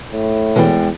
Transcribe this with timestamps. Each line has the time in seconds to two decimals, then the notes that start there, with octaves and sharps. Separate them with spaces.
0.12 A2
0.56 E2 B2 E3 G#3 G5